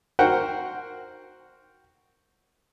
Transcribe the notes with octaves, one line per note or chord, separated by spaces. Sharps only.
F#4 A#4 C5 F#5 G5